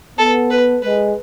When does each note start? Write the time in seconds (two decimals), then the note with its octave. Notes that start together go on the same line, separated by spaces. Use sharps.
0.18 B3 A4
0.51 B4
0.82 G#3 B4